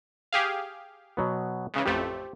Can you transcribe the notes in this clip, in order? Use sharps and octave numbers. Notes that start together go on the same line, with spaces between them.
G4 G#4 F5
B2 F#3 B3
G#2 C#3 E3
A1 F2 A3 G4 C5